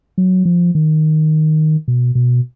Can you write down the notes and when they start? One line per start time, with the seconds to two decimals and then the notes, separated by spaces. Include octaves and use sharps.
0.18 F#3
0.45 F3
0.75 D#3
1.88 B2
2.15 B2